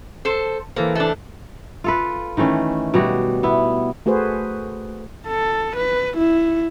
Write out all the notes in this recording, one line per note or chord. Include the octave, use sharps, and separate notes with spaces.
A4 C5
E3 A#3 A4 C5
A3 D4
F4 A4 B4
D#3 E3 A3 C#4
B2 G3 F#4
B3 E4
A3 F#4 G#4 B4 C5
A4
B4
E4